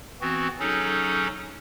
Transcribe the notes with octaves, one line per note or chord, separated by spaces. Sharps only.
E3 B3 C4 F#4
F#3 C#4 D#4 G#4 A4